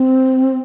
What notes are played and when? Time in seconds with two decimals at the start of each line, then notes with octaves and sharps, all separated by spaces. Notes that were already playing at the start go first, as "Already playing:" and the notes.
Already playing: C4